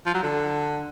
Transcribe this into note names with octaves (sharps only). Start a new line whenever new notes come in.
F3
F#3
D3